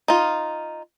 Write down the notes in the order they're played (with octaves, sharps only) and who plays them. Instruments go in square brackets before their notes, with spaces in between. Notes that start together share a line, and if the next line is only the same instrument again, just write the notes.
[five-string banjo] D#4 F4